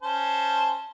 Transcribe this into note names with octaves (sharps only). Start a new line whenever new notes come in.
C#4 C5 A5